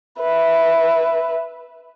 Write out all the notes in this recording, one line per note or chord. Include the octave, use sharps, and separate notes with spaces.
B4 E5